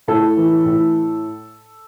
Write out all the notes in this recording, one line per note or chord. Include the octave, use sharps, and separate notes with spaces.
A2 A4
E3
A2